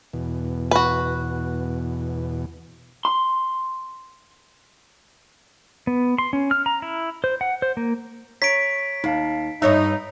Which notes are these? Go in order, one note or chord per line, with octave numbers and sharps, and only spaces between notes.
E2 B2
F#4 B4
C6
B3
C6
C#4
F6
A#5
E4
C5
F#5
C5
A#3
C#5 A#5 C#6 B6 D7
D#2 D#4 F5 A5
G2 D#4 C#5 E5 A#5